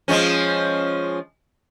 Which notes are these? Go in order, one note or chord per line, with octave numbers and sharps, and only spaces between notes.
F3 G#3 C#4